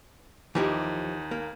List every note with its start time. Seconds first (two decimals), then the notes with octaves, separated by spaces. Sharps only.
0.55 D#2 E3 F3 D#4 G4
1.31 A#3